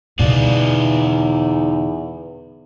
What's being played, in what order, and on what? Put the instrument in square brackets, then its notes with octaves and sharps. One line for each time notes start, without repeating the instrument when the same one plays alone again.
[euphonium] E2 [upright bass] B2 D3 [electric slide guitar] D#4 D5 F5